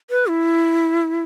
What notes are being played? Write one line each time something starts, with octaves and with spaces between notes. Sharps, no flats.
B4
E4